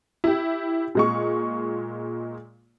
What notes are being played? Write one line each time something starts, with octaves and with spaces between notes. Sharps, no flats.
E4 G4
A#2 G#3 C#6